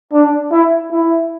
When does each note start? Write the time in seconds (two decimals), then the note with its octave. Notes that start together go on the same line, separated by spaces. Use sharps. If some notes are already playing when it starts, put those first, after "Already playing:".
0.13 D4
0.51 E4
0.92 E4